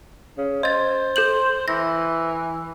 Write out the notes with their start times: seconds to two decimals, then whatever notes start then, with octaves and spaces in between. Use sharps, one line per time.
0.38 C#3
0.63 C5 D#5 A6
1.16 A4 G6 F#7
1.68 E3 A#6